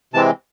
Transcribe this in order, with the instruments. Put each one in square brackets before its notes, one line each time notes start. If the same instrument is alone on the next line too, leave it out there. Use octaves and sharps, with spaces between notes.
[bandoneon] C3 E3 G#3 C4 A5